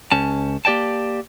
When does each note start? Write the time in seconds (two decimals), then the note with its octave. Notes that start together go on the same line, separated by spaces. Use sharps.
0.12 C#2 C#4 A5
0.65 A#3 G4 D5 G5 A5